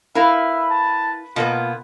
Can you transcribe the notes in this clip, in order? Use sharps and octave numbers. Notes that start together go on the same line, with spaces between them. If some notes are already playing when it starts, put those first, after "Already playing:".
E4 A#4 B4 E5 F5
A5
B2 A#3 B3 F4